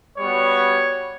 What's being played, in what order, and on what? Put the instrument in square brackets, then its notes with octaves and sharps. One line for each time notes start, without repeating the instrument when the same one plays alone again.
[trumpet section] G3 B3 F#4 C#5